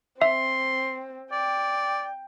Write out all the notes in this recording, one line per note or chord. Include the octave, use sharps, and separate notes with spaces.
C4 E5 C6
D5 G5